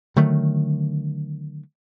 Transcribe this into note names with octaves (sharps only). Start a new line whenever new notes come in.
D3 D#3 F#3 A3